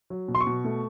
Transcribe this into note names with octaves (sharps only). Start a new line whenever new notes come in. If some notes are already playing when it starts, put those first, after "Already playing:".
F#3
B2
C6
C#6
B2
A3